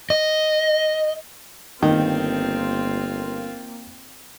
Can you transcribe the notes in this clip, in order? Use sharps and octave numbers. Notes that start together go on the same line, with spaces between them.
D#5
G1 D#3 A#3 C4 F4